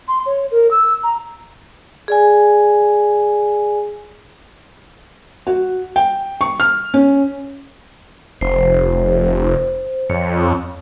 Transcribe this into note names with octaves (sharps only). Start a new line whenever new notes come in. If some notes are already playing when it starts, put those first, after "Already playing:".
C6
C#5
A#4
E6
A#5
G#4 D5 G#5
F#4
G5
C#6
F6
C#4
F1 C5
F2 C#5